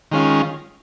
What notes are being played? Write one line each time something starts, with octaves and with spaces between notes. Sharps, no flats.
D#3 G#3 C#4 F4